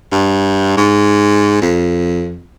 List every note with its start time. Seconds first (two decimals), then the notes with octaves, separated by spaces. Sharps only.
0.12 G2
0.77 G#2
1.62 F2